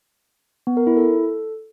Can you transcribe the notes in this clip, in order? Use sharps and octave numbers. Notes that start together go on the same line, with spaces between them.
B3
A#4
E4
A4